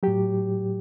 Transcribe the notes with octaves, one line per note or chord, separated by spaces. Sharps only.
A2 F#3 G4